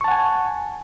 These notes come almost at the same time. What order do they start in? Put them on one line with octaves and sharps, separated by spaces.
C#6 A5 F#5 G#5